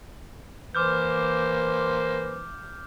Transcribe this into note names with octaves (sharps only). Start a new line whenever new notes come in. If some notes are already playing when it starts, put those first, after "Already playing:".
E3 A#3 C5 D6 F6 G6